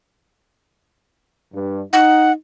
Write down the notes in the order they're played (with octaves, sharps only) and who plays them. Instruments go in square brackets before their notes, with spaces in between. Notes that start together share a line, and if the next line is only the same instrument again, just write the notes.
[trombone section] G2
[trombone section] D#4 [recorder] F#5